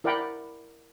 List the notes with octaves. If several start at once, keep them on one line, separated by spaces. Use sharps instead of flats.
E4 A#4 D5 F#5 G5 B5